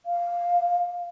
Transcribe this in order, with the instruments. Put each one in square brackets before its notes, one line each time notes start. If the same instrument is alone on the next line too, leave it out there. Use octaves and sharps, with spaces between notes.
[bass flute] F5